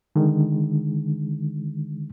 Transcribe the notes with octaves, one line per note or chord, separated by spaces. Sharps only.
D3 D#3 G#3